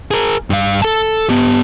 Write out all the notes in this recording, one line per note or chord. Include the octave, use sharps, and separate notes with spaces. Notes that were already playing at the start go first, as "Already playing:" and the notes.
G#4 A#4
G2 F5
A4 A5
B3 G4